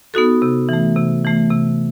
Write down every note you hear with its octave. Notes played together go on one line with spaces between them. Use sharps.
B3 D#4 F#4 A4
C3
E3 A3
C3
E3 A3
C3